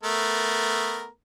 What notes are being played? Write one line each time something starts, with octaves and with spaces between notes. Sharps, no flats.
A3 B3 A#4